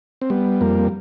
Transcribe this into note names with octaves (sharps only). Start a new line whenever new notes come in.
C4
G3 B3
F2 A#3